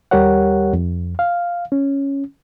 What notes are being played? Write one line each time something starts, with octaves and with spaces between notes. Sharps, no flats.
D#2 G3 G4 A#4 C#5 F#5
F2
F5
C#4